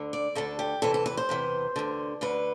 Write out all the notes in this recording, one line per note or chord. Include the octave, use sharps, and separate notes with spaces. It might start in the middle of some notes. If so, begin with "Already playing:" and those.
Already playing: D2 D3
D5
D2 D3 A4
G4
E2 C3 E3 A4
A4
B4
C5
E2 C3 E3
D2 D3
D2 D3 B4